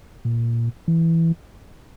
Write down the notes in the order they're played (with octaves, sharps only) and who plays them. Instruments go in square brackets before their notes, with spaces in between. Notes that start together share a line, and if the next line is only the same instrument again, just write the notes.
[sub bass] A#2
E3